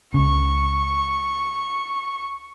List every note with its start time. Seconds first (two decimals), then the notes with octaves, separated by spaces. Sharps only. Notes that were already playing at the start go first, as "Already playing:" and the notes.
0.14 C#2 C#3 C#6